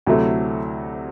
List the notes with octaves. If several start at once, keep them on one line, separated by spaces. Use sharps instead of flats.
D2 C3 F#3 A3 E4